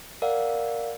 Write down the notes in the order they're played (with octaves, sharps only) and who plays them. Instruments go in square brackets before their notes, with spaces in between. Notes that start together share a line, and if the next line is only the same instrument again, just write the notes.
[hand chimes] A#4 D5 F5 F#5